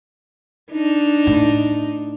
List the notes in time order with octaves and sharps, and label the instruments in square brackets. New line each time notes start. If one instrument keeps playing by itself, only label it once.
[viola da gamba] D4 D#4
[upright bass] A2